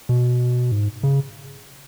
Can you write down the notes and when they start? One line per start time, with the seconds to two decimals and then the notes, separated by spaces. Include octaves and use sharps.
0.09 B2
0.72 G#2
1.03 C#3